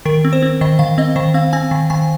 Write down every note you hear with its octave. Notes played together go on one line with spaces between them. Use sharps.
D#3 A#4
C4
C5
C4
D#3 D#5
D#3 F5
C4 D#5
D#3 C5
C4 F5
C4 G#5
D#3
D#3 G#5